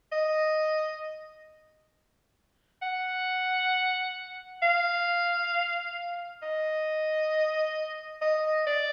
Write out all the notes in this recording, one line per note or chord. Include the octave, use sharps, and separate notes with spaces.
D#5
F#5
F5
D#5
D#5
D5